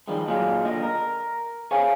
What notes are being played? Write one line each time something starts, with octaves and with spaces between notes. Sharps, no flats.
D#3 F3 G3 G#3
A#2 F#3 G#3 D#4 F4
A#2 D3 D#5
A#4
G#4 C5 C#5 F5 G#5